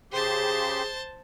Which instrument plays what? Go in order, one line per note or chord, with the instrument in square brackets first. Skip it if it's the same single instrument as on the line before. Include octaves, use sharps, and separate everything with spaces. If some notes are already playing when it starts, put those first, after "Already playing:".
[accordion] C#3 G4 C6 [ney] G#4 [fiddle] C5 A5